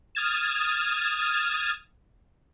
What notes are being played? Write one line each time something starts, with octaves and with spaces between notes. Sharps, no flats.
D#6 F6 G#6 A6 E7